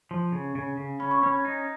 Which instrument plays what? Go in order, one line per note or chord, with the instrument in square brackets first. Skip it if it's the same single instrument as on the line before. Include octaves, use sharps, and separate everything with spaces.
[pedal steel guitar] F3
C#3
C#3
C#3
[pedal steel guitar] C#4 [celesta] B5
[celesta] C#6
[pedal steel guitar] C#4 [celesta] B5
[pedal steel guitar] D#4